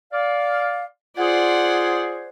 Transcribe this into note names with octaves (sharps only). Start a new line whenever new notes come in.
D5 F5
F4 G#4 C5 D5 F#5